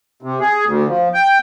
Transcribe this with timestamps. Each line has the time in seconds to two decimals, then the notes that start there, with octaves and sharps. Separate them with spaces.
0.22 C3
0.40 G#4
0.66 D2
0.88 F3
1.14 G5